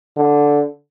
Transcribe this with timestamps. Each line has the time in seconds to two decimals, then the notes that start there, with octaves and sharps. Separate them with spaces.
0.17 D3